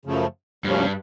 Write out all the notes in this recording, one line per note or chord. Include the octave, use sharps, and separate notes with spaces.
F#2 C#3 F3 A3
D2 G2 C3 F3 A#3 C#4